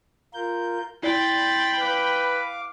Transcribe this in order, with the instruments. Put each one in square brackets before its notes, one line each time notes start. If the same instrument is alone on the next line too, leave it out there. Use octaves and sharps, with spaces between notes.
[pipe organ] F4 A#4 G6
[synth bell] E4 D5 [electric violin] G5 B5 [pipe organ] C6 G6 A6
[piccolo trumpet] B4 [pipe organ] F5 D6